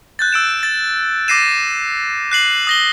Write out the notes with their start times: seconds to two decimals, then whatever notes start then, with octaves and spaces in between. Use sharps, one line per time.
0.19 F#6 G6 A6
0.32 E6 D7 E7
0.63 A6
1.28 D6 A6 A#6 C7 D#7 E7
2.32 F#6 C7 F#7
2.67 D#6 A#6 G7